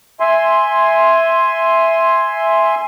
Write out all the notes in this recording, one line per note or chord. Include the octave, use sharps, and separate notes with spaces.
E5 G#5 C6